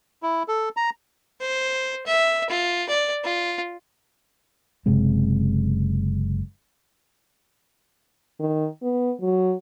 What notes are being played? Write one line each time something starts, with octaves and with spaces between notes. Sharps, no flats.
E4
A4
A#5
C5
E5
F4
D5
F4
F#1 C3 G#3 C4
D#3
B3
F#3